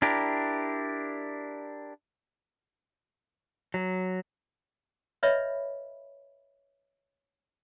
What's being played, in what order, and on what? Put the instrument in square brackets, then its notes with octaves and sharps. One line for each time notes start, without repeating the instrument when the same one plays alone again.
[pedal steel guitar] D4 E4 G4 A#4
[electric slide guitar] F#3
[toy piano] B4 C#5 D#5 E5 B5